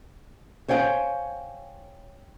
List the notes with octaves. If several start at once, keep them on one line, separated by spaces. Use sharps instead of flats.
C5 C#5 F5 G5 G#5